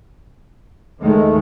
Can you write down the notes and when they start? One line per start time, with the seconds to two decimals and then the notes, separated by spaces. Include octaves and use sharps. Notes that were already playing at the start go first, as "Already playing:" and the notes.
1.03 D#2 D#3 G#3 A3